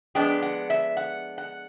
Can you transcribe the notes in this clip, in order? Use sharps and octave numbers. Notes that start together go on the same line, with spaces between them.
F3 G#3 B3 D4 G5
F#5
E5
F#5
F#5